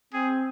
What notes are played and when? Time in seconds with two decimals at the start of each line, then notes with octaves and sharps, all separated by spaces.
0.14 C4 G#4